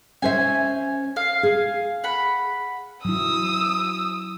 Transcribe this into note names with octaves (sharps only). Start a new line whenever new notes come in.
C#4 C5 E5 G#5
F5
G#4
F#5 B5
F#3 E4 D#6 E6